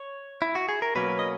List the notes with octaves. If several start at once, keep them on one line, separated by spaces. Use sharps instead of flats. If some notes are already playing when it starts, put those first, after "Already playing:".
Already playing: C#5
E4
F#4
G#4
A#4
B2 F#3 A#3 C#4 B4
D#5